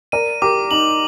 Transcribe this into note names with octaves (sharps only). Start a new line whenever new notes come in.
A#4 D5 D#7
G4 A#4 D6
D#4 F#7